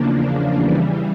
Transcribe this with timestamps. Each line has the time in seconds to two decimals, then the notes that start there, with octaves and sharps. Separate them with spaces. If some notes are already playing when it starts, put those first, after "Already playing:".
Already playing: E2 C#3 F3 A#3 D4
0.59 C#3 E3 G3